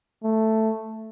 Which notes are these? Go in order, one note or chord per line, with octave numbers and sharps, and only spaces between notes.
A3